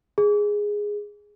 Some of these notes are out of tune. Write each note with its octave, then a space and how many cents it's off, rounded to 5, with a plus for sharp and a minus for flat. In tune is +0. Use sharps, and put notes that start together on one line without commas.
G#4 -5